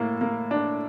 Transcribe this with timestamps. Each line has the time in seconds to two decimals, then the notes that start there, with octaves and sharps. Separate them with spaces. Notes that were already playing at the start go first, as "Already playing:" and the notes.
Already playing: A2 A#3
0.21 A#3
0.51 D4